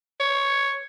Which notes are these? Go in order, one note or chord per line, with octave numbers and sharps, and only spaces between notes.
C#5